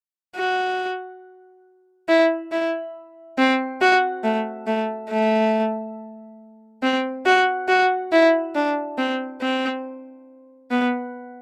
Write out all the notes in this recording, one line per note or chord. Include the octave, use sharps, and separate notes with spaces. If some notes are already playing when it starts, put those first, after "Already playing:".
F#4
E4
E4
C4
F#4
A3
A3
A3
C4
F#4
F#4
E4
D4
C4
C4
B3